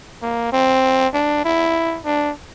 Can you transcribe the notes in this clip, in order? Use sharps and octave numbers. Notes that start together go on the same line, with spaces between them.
A#3
C4
D4
E4
D4